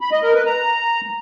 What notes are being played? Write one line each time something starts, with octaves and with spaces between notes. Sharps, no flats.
B5
D#5
A#4
B4
A#5